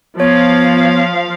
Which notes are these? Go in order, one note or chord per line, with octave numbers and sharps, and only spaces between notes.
F3 B3 C#5 F5